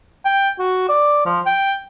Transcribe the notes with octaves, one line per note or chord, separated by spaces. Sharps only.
G5
F#4
D5
F3
G5